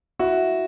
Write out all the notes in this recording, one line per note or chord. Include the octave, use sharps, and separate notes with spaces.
E4 F#4